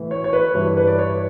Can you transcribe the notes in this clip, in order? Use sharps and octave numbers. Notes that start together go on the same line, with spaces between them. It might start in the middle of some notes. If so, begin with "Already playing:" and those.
Already playing: A2 E3
C#5
C#5
B4
G2 E3 C#5
B4
D5
C#5